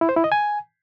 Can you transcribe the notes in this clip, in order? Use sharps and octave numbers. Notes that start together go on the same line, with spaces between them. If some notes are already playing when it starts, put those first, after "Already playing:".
E4
C5
E4
D#5
G#5